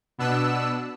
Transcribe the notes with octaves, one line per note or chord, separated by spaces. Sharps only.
B2 B3 D4 E6 F#6